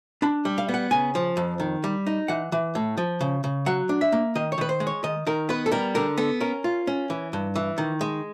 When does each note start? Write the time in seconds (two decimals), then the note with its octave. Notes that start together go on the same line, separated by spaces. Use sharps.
0.22 D4 B5
0.45 G3
0.58 F5
0.69 B3
0.74 F#5
0.91 C#3 G#5
1.15 F3
1.37 F2
1.60 D#3
1.84 G3
2.07 D#4
2.28 E3 F#5
2.52 E3
2.75 A2
2.97 F3
3.21 C#3
3.44 C#3
3.66 F#3 F#5
3.89 D4
4.01 E5
4.12 A#3
4.35 D#3 D#5
4.52 C#5
4.58 D#3 B4
4.69 C5
4.80 G#3
4.87 C#5
5.04 D#3 D#5
5.27 D#3 A#4
5.49 B3 B4
5.66 A4
5.72 G3 A#4
5.95 D3 A#4
6.17 B3 A4
6.40 C#4 A#4
6.64 F4
6.87 C#4
7.10 E3
7.33 G2
7.55 E3
7.78 D#3
8.01 G#3